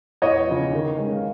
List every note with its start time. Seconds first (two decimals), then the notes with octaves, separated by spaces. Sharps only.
0.22 E2 C#5 D#5
0.47 C#3 F3
0.73 D#3
0.97 G#3 C#4
1.13 F5